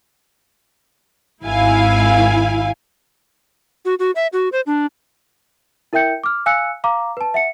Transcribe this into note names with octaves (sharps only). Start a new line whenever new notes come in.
G#1 E4 F5 G#5
F#4
F#4
E5
F#4
C5
D4
E4 A#4 E5 G5 G6 C#7
D6 F6
F5 G#5 E6 F#6 C#7
F5 A#5 D6
B4 A5
E5 F#5 C#7